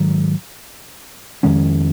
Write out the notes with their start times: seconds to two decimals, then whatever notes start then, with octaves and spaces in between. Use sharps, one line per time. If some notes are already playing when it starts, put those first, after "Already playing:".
Already playing: G#2 D#3 F#3
1.43 F2 D#3 G#3 C#4